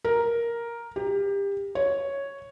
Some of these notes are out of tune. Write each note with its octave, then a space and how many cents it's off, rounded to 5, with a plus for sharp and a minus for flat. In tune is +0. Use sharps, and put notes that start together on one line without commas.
A#4 +5
G4 +25
C#5 +0